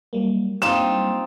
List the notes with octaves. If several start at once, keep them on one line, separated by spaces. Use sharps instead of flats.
F#3 G3 A#3
C4 D#4 F4 E7